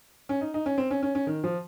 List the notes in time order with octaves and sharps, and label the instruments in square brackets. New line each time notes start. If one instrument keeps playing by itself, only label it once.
[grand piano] C#4
D#4
D#4
C#4
C4
C#4
C#4
C#4
D#3
F3